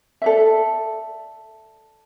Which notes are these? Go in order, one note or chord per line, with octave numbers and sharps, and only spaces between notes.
A4 D5 E5